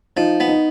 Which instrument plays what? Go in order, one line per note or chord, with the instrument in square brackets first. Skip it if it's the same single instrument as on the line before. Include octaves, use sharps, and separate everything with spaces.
[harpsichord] F3 [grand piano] D#4
[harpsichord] B3
[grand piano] D#4